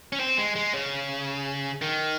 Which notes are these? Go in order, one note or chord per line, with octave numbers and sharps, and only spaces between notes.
C#4
C4
G#3
G#3
C#3
D#3